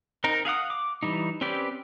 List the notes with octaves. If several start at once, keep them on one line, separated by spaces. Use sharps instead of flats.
C4 D#4 A#4
G#4 F5 F#5 D#6
D6
E3 G3 D#4
C4 C#4 G4 B4 D5